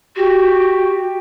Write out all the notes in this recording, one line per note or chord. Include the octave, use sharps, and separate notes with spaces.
F#4 G4